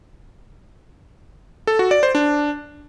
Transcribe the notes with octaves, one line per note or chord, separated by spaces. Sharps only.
A4
F#4
D5
C5
D4